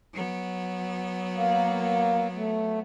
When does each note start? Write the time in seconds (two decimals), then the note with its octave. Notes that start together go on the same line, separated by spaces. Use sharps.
0.14 F#3 B3
1.35 A#3
2.35 A3